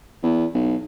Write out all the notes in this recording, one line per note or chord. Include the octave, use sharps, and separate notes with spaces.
E2
B1